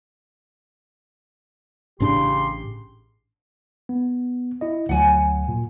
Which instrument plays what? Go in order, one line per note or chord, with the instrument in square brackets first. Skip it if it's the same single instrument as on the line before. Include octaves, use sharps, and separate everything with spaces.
[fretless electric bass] A1 A2 D4 [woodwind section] C#3 G4 C6
[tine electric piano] B3
E4 D#5
[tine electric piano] D2 F#3 [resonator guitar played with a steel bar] F#5 G#5
[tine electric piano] A#2